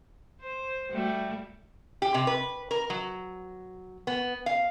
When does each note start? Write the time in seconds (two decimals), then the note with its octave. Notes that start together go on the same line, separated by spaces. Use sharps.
0.41 C5
0.91 G3 A3 F#4
2.02 G4
2.14 C3
2.27 B4
2.71 A#4
2.90 F#3
4.07 B3
4.46 F5